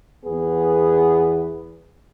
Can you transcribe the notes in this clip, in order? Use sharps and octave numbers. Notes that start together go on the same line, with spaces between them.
E2 B3 G#4